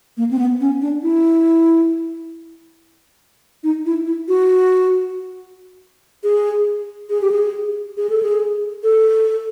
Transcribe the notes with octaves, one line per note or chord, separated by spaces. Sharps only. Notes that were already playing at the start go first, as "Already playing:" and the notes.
A#3
C4
B3
C#4
D4
E4
D#4
E4
E4
F#4
G#4
G#4
G4
G#4
G#4
A4
G#4
A4